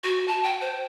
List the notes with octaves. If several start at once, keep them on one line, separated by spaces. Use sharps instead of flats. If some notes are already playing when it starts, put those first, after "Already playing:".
F#4
A5
G5
C5